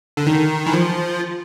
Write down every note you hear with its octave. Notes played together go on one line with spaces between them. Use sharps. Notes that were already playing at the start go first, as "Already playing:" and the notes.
D3
D#3
E3
F3